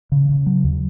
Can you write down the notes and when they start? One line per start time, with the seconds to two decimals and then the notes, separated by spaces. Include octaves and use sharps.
0.12 C#3
0.29 C#3
0.46 F#3
0.64 D#2